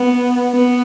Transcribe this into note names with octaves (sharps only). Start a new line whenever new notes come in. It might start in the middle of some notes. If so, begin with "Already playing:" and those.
Already playing: B3
B3